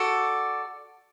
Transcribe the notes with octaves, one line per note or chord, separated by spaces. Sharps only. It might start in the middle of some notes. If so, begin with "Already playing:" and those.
Already playing: F#4 A4 D5